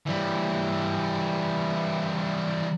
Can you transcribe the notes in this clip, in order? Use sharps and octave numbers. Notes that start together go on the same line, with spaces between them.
E3 G3